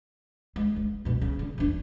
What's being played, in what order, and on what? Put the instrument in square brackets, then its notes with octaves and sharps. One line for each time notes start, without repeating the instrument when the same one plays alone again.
[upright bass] G#3
G#3
G2 B2
C#3
D3
E2 D4